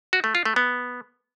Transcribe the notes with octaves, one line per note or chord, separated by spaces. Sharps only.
F#4
A3
F4
A3
B3